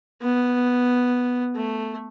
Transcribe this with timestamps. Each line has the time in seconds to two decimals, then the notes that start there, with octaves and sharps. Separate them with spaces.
0.22 B3
1.56 A3